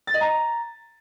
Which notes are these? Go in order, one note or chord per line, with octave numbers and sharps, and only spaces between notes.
A6
D#5
A#5